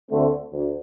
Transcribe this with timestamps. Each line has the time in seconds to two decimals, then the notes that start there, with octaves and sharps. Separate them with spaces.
0.10 D2 D3 A3 C4
0.52 D2